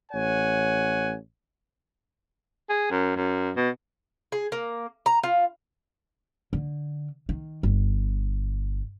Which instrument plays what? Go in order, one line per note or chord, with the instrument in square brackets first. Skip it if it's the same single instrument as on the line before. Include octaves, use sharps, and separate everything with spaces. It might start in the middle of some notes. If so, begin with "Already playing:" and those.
[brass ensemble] A1 C#5 F#5 G#5
[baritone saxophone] G#4
F#2
F#2
B2
[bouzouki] G#4
A#3
A#5
F4
[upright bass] D3
D#3
G1